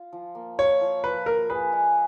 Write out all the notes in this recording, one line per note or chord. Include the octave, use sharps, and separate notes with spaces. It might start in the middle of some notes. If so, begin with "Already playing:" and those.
Already playing: F4
F3
A#3
F4 C#5
F3
F3 B4
A#3 A#4
G#4 B4
G#3